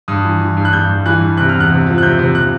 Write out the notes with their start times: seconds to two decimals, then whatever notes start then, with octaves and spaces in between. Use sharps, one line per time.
0.08 G2 D#6
0.25 E3
0.41 E3
0.57 G2
0.65 F#6
0.73 G2 G6
0.89 G2
1.06 E3 F#6
1.21 G2
1.37 C3 F#6
1.49 E2 F6
1.60 F#6
1.70 C3
1.86 F3
1.98 F#6
2.03 C3 G6
2.19 C3
2.34 C3 F#6